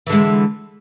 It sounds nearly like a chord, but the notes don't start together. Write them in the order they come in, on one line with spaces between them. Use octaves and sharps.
E3 D3 G#3